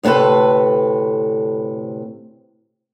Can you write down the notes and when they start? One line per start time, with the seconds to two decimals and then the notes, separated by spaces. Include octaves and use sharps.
0.03 D2 A2 C3 A4 B4